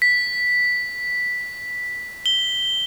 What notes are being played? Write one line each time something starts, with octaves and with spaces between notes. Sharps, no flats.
B6
G7